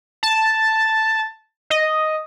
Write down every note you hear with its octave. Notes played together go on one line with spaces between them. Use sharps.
A5
D#5